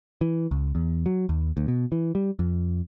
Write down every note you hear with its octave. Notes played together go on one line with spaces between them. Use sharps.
E3
C#2
E2
F#3
D#2
D2
B2
E3
G3
F2